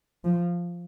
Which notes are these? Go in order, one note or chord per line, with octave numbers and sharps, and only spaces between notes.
F3